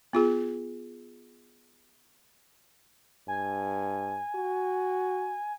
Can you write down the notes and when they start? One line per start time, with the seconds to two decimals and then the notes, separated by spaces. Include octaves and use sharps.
0.13 B3 F4 G#4
3.28 G2 G#5
4.35 F#4